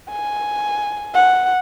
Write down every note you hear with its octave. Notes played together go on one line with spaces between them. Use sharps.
G#5
F#5